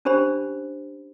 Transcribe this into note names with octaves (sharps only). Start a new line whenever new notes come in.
C#4 D4 G4 C5 B5